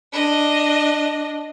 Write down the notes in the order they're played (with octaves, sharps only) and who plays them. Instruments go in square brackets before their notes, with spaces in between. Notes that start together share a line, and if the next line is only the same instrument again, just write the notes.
[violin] D4 D#5